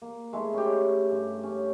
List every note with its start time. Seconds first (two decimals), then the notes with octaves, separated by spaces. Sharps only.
0.02 A#3
0.33 G#3 A3 E4
0.53 C#4 G4
1.11 G2
1.43 C#4